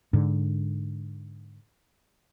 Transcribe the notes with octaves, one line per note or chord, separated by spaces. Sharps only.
G#2 D3